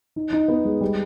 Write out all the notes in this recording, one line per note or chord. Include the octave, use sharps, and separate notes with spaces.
D#4
D#4
B3
G#3
G3